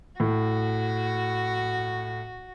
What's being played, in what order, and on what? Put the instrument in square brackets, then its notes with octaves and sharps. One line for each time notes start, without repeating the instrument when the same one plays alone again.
[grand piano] A2 [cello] F#4